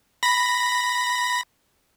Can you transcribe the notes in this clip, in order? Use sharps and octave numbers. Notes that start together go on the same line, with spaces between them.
B5 A#6